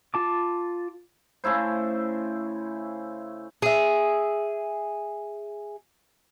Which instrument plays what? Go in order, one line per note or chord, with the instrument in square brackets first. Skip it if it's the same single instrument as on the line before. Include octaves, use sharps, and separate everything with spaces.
[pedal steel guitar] F4 A5 D6
[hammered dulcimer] C#3 A3 E4 C5
[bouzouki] G#4 E5